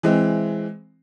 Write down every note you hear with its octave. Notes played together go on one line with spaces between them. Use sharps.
E3 G#3 C4